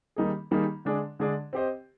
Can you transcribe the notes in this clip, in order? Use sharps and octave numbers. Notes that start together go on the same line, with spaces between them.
D#3 G3 A#3 D#4 G#4
D#3 G3 A#3 D#4 G#4
D3 G#3 D4 G#4 D5
D3 G#3 D4 G#4 D5
C4 G4 C5 D#5